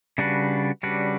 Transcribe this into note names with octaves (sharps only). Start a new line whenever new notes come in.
C#3 G3 D4 F#4 B4
C#3 G3 D4 F#4 B4